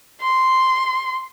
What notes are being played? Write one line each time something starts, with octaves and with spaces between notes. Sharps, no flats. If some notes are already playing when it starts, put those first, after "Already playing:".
C6